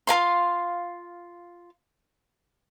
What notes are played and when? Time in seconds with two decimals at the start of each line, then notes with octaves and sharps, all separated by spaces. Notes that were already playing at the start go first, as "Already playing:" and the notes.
0.07 F4 A#4 F5 C6